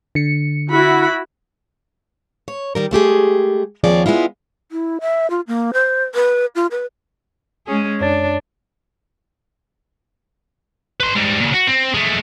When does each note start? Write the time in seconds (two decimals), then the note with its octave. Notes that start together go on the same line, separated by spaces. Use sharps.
0.15 D3 C#7
0.71 E4 F#4 B5
2.48 C#5
2.75 D#3 G3 A#4
2.91 G#3 A3 G4 G#4
3.84 D#2 F3 C4 G#4 C#5 D5
4.06 G#3 B3 E4 F4
4.72 E4
5.01 E5
5.30 F4
5.47 A#3
5.73 C5
6.15 B4
6.55 F4
6.71 B4
7.67 G#3 C#4 G#4
8.00 F#2 D4 C#5 A6
11.00 B4 C6
11.16 G#2 G3
11.40 A#2 C#3
11.54 F#4
11.68 C4
11.94 G#3 A3